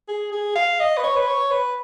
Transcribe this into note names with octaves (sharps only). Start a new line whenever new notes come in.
G#4
G#4
F5
D#5
B4
C#5
B4
C#5
B4